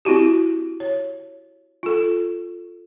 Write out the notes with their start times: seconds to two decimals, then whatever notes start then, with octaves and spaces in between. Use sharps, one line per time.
0.05 C4 E4 F#4 G4
0.80 C#5
1.83 F4 A4